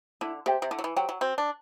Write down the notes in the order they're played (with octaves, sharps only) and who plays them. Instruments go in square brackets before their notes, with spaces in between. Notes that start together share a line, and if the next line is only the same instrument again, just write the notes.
[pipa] D3 [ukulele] E4
[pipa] C3 [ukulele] G4 C5 G5
[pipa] C3
[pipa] D3 [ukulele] E4
[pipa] F#3
E3
[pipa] F#3 [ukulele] G4 C5 G5
[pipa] F#3
[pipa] C4 [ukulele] F#4
[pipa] D4